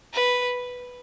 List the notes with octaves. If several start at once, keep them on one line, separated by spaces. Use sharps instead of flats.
B4